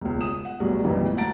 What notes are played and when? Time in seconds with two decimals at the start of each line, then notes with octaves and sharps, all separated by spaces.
0.01 E1 C#2
0.21 D#6 E7
0.45 F#5
0.60 B1 E2 A2 F#3 G3
0.84 G#1 F2 A#2 D#3 E3 G3
1.17 D2 F#5 A5 A#5 A6 D7